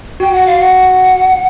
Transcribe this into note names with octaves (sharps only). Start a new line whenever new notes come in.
F#4 G5
F#5
F5
F#5